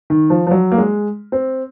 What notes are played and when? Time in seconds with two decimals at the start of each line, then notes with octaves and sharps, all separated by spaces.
0.10 D#3
0.30 F3
0.47 F3
0.51 F#3
0.72 A#3
0.78 G#3
1.32 C4